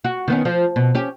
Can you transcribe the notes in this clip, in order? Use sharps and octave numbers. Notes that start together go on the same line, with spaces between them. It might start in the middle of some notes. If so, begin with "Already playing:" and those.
F#4
D#3 B3 C#4
F3
B2
C#4 G4